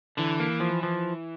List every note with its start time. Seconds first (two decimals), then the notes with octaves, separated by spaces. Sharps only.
0.17 D3 E3
0.40 A#3
0.60 F3
0.83 F3